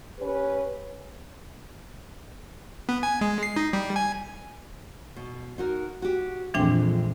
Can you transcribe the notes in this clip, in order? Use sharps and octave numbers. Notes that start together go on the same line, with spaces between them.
C#4 G4 B4
B3
G#5
G#3
C7
D#4
G3
G#5
B2
D#4 F#4 A#4
F#4 G4
A#1 F2 E3 G#3 A3 C4 D4 G5